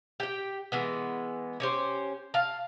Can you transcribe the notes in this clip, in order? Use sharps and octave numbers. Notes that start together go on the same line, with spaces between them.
G4 G5
E3 G#3 B3
C#4 G4 C5
F5 A5